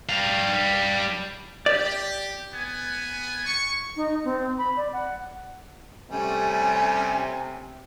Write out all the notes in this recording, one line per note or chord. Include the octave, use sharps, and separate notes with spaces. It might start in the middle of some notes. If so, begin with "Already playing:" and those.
G3 F5
G4 D5
B3 G#5
C#6
D#4
C4
B5
D5
F#5
C3 G3 A3 C#4 G#5